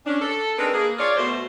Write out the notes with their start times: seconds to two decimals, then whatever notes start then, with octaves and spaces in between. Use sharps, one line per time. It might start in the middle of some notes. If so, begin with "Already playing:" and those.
0.06 C#4 D4
0.22 A4
0.58 C4 D4 D#4 G#4 A#4 B4
0.74 A#3 G#4
0.99 F4 C#5 D5
1.17 B2 A3 C5